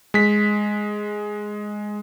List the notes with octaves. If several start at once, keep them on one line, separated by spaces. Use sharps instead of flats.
G#3 B6